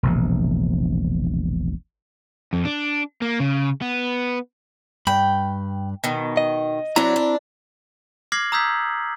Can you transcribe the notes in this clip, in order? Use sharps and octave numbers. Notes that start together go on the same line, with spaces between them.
E1 A#1 C3
F2
D4
A#3
C#3
B3
G2 G5 B5
B2 D#3
D#5
F#3 C4 D4 E4 A#5
D4
D6 F6 G#6 A#6 C7 F#7
A#5 D#6 E6 G6 G#6 B6